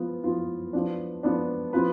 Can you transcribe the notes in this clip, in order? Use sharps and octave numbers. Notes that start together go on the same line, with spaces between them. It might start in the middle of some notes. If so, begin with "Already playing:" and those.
Already playing: F3 B3 F4
F3 B3 F4
F3 B3 D4
F3 B3 D4
F3 B3 F4 B4